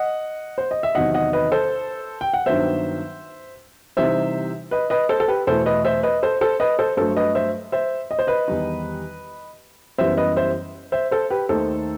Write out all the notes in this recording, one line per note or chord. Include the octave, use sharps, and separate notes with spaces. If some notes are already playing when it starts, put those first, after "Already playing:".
Already playing: D#5 F#5
C5
D#5
E5
E2 C3 D#3 F#3 D#5 F#5
D#5 F#5
B4 D#5
A4 C5
G5
F#5
G2 D#3 F#3 B3 C5 E5
C3 E3 G3 D#4 C5 E5
B4 D#5
B4 D#5
A4 C5
A4
G4 B4
E2 B2 A3 E4 A4 C5
B4 D#5
C5 E5
B4 D#5
A4 C5
A4 C5
B4 D#5
A4 C5
G2 F#3 A3 A4 C5
B4 D#5
C5 E5
C5 E5
D#5
C5
B4 D#5
E2 D#3 G3 D#4
F#2 E3 G3 B3 C5 E5
B4 D#5
C5 E5
C5 E5
A4 C5
G4 B4
D#2 D#3 A3 D#4 A4 C5